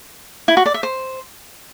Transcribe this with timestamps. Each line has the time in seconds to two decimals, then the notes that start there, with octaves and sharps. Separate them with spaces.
0.48 E4
0.57 F#4
0.66 D5
0.74 E5
0.83 C5